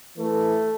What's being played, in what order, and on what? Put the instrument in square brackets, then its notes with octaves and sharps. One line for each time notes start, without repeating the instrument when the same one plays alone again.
[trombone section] A2 E3 A3